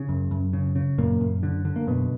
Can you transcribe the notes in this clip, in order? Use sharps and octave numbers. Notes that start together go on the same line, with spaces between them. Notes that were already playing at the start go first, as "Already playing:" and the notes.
Already playing: C#3
F#2
F#2
C#3
C#3
F#2 A#2 A#3
F#2
D3
D3
A#3
F#2 B2 B3